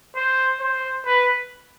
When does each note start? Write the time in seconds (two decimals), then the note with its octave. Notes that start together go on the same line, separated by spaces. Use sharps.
0.16 C5
0.60 C5
1.06 B4